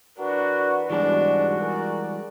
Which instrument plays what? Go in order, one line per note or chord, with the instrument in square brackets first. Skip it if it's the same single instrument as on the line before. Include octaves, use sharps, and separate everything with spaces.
[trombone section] E3 A#4 B4 [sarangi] D4 [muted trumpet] F#4
[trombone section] G#2 B2 [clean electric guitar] E3 G3 G#3 [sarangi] D4 [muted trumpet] F#4
[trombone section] G#4 A#4 [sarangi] D5